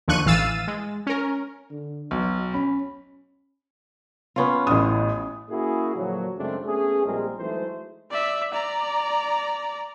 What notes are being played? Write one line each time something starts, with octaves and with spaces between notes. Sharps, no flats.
D#2 D3 F3 C#6 F#6 D#7
A1 E3 F5 E6 A6 D#7
G#3
C#4 A#4
D3
B1 B2
C#4 B5
B3 C#4 F4
A1 A2 D#6
A#3 C#4 E4 F#4 G#4
A#2 D3 F3 F#3
F#2 C#3 G#3 A3 C4 D4
A3 B3 C#4 G#4
A#1 A#2 G3 G#3 C4 A#4
E3 F#3 G#3 A3 D#4 C5
D5 E5
D5 A#5